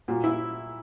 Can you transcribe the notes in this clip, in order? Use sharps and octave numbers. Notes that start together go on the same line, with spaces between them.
A#2 F#4
E4